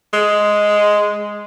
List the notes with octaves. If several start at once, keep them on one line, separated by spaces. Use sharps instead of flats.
G#3